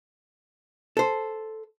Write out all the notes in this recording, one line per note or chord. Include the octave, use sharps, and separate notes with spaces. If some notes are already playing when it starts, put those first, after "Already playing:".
A4 C5